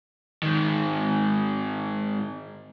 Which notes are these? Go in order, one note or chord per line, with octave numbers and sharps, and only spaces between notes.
G#2 D#3